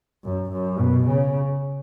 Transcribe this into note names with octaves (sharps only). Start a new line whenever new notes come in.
F#2
F#2
B2
C#3